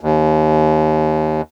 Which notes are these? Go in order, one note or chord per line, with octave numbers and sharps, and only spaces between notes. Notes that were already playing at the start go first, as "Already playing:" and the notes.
D#2